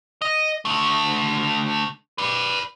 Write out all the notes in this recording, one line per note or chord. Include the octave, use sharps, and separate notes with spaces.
D#5
D3 A3
B4 D5